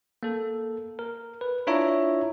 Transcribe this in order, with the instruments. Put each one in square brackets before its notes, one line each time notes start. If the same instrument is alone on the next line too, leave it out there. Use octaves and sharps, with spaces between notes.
[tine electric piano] A#3 A4
A#4
B4
D4 E4 F4 C#5 E5 A#5